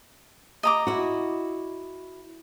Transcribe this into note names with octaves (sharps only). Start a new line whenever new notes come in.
D#5 A#5 D6
E4 F#4